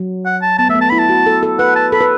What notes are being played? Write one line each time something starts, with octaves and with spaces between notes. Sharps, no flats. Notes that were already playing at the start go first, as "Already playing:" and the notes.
Already playing: F#3
F#5
A5
B3 A5
A3 E5
B3
A5
E4 B5
A5
F#4
A4
A4
B4 F#5
A5
A4 B5
B4